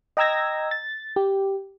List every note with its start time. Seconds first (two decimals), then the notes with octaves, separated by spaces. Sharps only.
0.17 D#5 G5 A#5 E6 G#6 A#6
0.71 A6
1.16 G4